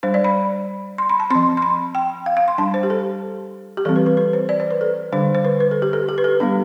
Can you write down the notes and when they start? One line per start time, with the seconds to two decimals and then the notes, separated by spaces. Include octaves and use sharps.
0.03 G3 D4 C5
0.14 D5
0.24 B5
0.98 C6
1.09 B5
1.20 A5
1.30 F3 C4 C6
1.57 C6
1.62 B5
1.95 G5
2.26 F5
2.37 F5
2.48 C6
2.58 G3 D4 A5
2.74 C5
2.83 G4
2.90 A4
3.77 G4
3.85 E3 G3 C4 A4
3.96 B4
4.06 B4
4.17 B4
4.33 C5
4.49 D5
4.60 C5
4.71 B4
4.81 A4
5.12 D3 G3 D4 C5
5.35 C5
5.44 B4
5.60 B4
5.71 A4
5.82 G4
5.93 A4
6.09 G4
6.18 B4
6.24 A4
6.40 G3 B3 D4 G4